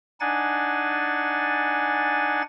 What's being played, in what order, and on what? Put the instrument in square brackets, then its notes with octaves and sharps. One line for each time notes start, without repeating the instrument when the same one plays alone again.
[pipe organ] D4 D#4 F#5 G#5 A6